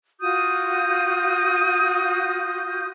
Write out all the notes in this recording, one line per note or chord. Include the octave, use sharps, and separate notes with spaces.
F4 F#4 D#6 G6